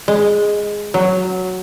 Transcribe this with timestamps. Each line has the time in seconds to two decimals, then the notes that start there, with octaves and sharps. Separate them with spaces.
0.08 G#3
0.94 F#3